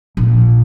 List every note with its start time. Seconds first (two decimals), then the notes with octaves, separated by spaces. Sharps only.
0.17 A#1